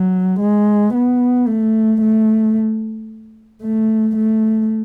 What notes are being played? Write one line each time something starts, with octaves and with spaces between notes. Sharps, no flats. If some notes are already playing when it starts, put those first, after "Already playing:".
Already playing: F#3
G#3
B3
A3
A3
A3
A3